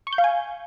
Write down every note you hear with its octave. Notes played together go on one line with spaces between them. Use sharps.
C#6
G6
F5
G#5